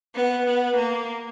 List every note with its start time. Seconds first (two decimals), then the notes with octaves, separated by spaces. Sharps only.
0.15 B3
0.45 B3
0.76 A#3